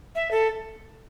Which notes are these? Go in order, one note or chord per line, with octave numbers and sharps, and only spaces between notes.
E5
A4